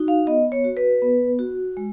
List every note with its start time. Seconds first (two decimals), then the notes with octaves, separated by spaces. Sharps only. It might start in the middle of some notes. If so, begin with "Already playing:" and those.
Already playing: D#4 F#4
0.08 F5
0.27 B3 D#5
0.52 C#5
0.64 F#4
0.77 B4
1.02 B3
1.39 F#4
1.77 G#3